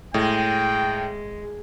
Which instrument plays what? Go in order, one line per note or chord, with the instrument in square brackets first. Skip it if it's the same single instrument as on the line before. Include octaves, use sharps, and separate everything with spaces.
[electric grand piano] A2 [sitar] G#3 [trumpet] G5